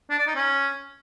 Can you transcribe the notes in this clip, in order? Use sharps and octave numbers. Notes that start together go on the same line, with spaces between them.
D4
D5
D#4
C#4